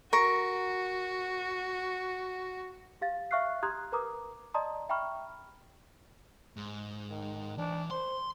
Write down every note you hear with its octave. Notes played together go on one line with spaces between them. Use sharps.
F#4 A#4 C#6
G4 F5 A6
E5 F5 C#6 F6 F#6 C7
G4 A#5 C6 D#6 F#6 G#6
A#4 B4 A#5 D6 D#6
D5 D#5 A5 A#5 C6 D#6
E5 G5 A#5 B5 C#6 F6
G#2
D#3
E3 D4
C5 C6